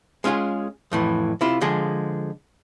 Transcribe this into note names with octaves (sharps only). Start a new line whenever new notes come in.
G#3 C#4 F4 G4 G#4
F2 A2 E3
C3 E4 F4
D3 F3 G#3 G#4